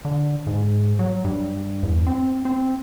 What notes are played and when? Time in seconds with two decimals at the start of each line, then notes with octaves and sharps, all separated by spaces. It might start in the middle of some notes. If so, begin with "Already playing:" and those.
0.05 D3
0.47 G#2
0.99 F#3
1.25 G2
1.83 E2
2.07 C4
2.45 C4